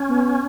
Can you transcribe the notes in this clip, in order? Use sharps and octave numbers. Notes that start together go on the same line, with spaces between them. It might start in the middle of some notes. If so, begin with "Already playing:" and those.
Already playing: C#4
B3